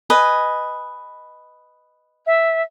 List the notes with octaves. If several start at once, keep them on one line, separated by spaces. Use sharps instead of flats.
B4 D#5 G#5
E5